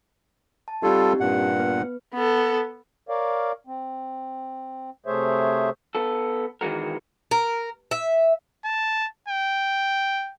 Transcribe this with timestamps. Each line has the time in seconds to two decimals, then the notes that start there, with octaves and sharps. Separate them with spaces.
0.68 A5
0.83 G3 C4 D#4 F4 G4 A4
1.20 G2 A#2 F#5
1.60 B3 B4
2.14 B3 A4
3.09 A#4 C#5 D5 F5
3.67 C4
5.06 C3 A3 G#4 C5 C#5 E5
5.95 B3 A4
6.61 D#3 E3 G#3 F#4 A#4
7.31 A#4
7.91 E5
8.65 A5
9.28 G5